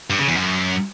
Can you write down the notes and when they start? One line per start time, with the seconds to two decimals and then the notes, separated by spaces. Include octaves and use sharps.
0.10 G2
0.19 C#3
0.28 E2
0.37 F#2